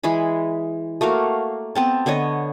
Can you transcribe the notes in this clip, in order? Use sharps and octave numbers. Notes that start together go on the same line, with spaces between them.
E3 G#3 G#4 B5
A3 A#3 F#4 F5
B3 C4 A5
D3 B3 C#5 D#5